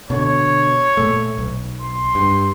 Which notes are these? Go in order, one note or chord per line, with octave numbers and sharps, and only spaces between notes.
B2 D3 C#5
A#2 A3
B1
C6
G2